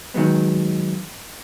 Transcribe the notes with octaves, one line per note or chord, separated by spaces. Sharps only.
D#3 F#3 G#3 B3